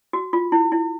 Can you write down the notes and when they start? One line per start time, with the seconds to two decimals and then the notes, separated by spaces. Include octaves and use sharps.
0.13 F#4
0.33 F4
0.52 E4
0.72 E4